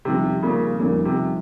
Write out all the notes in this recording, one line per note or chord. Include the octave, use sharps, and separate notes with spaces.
F2 C3 D#3 G3 C#4 F4
A#2 C#3
F2 A#2 D#3 G3 C#4 F4
C3